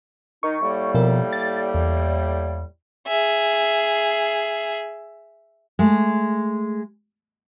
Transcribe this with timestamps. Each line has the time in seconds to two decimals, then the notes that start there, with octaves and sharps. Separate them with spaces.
0.43 D#3 D#4 C#6
0.61 A2 G3 A#3
0.95 B2 F3 A#4
1.33 A6
1.74 E2
3.08 G#4 E5
5.79 G#3 A3